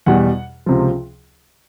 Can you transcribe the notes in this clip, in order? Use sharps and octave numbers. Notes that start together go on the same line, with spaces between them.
E2 B2 G3 F#5
C#2 C3 F3